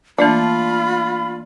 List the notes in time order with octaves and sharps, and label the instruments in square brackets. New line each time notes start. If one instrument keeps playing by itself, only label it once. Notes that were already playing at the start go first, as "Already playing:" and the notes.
[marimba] E3 A3 A#3 [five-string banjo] D4 [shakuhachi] F4 [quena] B5